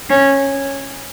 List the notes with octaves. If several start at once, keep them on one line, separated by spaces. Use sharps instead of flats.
C#4